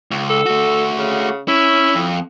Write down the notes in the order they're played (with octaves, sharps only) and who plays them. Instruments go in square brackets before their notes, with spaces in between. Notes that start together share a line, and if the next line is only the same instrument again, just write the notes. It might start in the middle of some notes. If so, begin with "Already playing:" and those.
[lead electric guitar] C#2
[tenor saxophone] A4
[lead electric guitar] A3 F#4
[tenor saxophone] C#3
[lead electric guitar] C#4 [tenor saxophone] E4
[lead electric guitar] F2